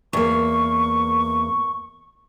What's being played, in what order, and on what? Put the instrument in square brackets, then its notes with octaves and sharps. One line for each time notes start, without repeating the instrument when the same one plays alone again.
[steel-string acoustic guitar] E2 A#3 [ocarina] C#6